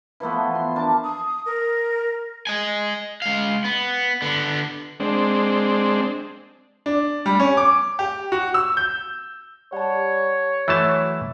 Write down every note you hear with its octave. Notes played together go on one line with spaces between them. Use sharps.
E3 F3 A3 B3
C6
D4 A#4 A5
D#6
A#4
D#5 G#5
G#3 F5
B3
D3 B3
G#3 C4 D4
D4
G3
C#4
D6
G4
F#4
E6
G6
G3 C#5 F#5 A5
E3 F#3 A3 E5 A5